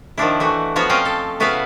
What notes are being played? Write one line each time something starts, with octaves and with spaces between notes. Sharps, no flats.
D#3 F3 D4 E4
E3 A3 F#4
F3 B3 F#4 C#5 F5
C4 C#4 D#5 F5 G5
A4
C#3 B3 E4 F#4 B4 F5